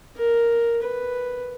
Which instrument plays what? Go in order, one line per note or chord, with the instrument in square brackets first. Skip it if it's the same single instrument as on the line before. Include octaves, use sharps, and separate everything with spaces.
[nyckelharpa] A#4
B4